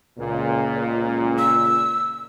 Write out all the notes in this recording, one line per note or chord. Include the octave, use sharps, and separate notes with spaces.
C#2 A#2
E6